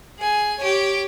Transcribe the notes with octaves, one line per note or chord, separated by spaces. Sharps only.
G#4 G#5
G4 C#5